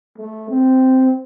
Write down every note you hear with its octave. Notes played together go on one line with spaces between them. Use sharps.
A3
C4